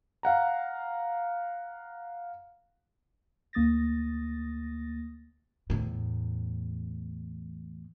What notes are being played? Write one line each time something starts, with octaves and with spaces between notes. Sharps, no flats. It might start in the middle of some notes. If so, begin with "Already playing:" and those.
F5 F#5 A#5
D2 A#3 D#6 A6 A#6
E2 A2